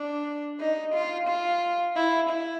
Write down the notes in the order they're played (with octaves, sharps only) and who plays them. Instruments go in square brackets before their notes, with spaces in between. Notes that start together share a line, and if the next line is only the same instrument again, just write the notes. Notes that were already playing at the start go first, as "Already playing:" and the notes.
Already playing: [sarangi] D4
D#4
F4
F4
E4
E4